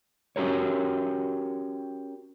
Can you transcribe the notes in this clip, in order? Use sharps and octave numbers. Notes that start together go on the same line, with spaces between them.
C#4 F#4 G4 A#4 C#5